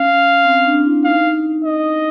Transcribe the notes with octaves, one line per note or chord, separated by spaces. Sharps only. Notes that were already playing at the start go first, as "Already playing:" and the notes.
Already playing: C#4 F5
C4
D4
E4
D#4 F5
D#5